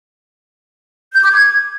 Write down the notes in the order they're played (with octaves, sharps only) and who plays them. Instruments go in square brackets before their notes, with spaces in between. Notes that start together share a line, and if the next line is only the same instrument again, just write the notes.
[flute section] G6
D6
G#6